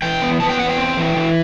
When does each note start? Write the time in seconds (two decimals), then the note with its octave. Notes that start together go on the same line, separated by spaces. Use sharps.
0.02 E3 G5
0.22 B3
0.40 B3 A5
0.49 G5
0.59 E2 F#5
0.69 G5
0.78 C4
0.97 E3
1.16 E3